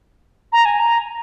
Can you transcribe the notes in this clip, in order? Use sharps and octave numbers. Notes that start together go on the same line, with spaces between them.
A#5
G#5
A#5